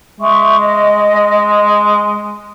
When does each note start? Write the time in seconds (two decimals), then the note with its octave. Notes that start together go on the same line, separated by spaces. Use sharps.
0.21 G#3 E5 C#6
0.58 D#5